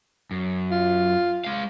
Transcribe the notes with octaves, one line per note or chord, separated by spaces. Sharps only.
F#2
F4
G#3 F5